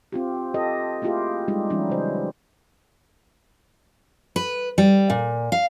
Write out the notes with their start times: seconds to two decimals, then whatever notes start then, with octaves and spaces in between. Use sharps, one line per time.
0.12 C4 F4 G4
0.54 F4 G4 A4 D#5
1.02 A3 A#3 E4 F4 G4 G#4
1.48 G3 G#3 D#4 F4 G4
1.70 E3 F#3 G3 C#4 D#4 E4
1.90 C#3 C5
4.36 B4
4.78 G3
5.10 A#2
5.52 F5